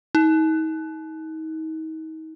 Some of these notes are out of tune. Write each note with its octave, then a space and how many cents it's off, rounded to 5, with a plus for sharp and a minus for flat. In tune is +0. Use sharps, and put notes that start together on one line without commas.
D#4 +35